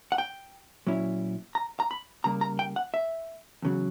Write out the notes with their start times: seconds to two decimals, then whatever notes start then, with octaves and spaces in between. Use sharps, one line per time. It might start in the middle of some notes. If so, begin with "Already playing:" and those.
0.12 F#5
0.18 G5
0.87 A#2 F#3 C#4 E4
1.55 A#5
1.80 A#5
1.91 B5
2.24 C#3 G3 A#3 A#5
2.41 A#5
2.59 G5
2.76 F#5
2.94 E5
3.62 E2 C#3 F#3